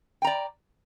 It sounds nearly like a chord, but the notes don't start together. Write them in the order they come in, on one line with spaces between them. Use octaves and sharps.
G5 A#5 D5